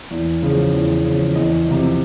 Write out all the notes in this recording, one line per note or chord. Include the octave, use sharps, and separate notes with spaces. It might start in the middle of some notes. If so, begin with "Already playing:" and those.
E2
C#3 F3
E2
C#3 F3
E2 D#5
C3 F3